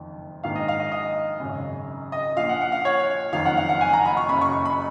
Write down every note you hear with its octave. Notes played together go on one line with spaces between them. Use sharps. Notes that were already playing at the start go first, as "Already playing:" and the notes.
Already playing: F#1 F2 D#3
A#1 G#2 D#3 F5
D#5
F5
D#5
D#5
G#1 F#2 C#3
D#5
A#1 A#2 F5
F#5
F#5
F5
C#5
F#1 F2 D#3 F5
F#5
F5
F#5
G#5
A#5
B5
C#6
F#1 F#2 C#3 B5
C#6
C#6
B5